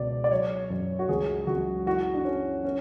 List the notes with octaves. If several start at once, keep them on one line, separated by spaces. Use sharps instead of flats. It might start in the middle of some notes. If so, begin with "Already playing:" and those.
Already playing: C#2 B2 D5
D5
F#3 C#5
F#2
F#4
C#2 G#4
C#2 F#4
E3 F#4
D4
E3 C#4
C#4